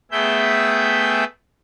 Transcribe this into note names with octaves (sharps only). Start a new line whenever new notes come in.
A3 B3 G#4 E5 G5 G6